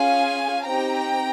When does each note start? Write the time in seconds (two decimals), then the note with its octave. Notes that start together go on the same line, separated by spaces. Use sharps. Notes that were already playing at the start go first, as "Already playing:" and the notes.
Already playing: C#4 F4 G#4 F5 G#5
0.66 C4 D#4 G4 G5 A#5